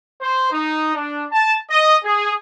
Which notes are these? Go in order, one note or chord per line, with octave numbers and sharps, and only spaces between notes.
C5
D#4
D4
A5
D#5
G#4